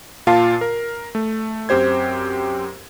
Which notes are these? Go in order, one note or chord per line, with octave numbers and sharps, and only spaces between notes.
A#2 F4 F5 A5 C7
A#4
A3
F#2 C4 G4 C5 G#6